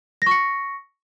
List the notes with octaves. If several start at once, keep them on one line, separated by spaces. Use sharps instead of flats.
C#6 A#6 C#7